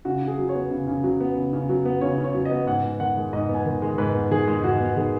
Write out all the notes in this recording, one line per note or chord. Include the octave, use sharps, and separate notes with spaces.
C#3 F#4
C#3
G#4
F#3
C#5
B3
C#3
C#3
F#3
B3
C#3
C#3
F#3
B3
C#3 C#5
C#3
C#5
F#3
D#5
B3
G#2 F#5
B3
D#3 F#5
G#3
G#2 D#5
B3
G#5
D#3
G#3
G#2 B4
B3
D#3 G#4
G#3
D#4
G#2 F#4
B3
D#3 G#4